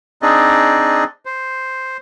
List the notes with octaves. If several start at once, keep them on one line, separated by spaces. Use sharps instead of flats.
C4 D4 D#4 G#4 D5 D#5
C5